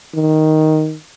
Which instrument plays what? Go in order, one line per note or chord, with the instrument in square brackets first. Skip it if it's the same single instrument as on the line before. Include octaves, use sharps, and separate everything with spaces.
[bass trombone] D#3